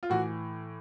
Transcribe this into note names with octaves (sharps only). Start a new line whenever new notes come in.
F4
A2 E3 F#4